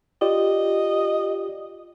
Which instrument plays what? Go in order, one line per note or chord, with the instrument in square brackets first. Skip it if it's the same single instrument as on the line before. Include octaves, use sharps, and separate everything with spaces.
[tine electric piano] F4 G4 D5 [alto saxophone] D#5